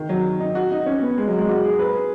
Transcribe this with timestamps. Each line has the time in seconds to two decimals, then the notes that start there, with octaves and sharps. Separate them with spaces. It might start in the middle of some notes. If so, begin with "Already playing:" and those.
Already playing: D#3
0.09 F#3
0.40 D#4
0.55 F#4
0.72 D#4
0.86 C#4
1.02 B3
1.18 G#3
1.27 F#3
1.38 G#3
1.49 F#4
1.64 G#4
1.79 B4
1.95 G#4